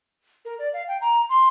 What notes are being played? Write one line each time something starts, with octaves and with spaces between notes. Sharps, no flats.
A#4
D5
F5
G5
A#5
C6